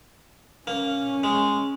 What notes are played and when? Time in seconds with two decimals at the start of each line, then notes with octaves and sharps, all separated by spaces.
0.67 A#3 C#4
1.24 G#3